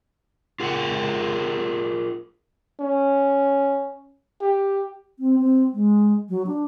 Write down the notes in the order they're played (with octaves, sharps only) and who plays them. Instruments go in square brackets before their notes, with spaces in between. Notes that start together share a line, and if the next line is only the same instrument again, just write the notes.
[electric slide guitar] F4 G#4 A#4 F#5
[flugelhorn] C#4
G4
[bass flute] C4
C4
G#3
F#3
D4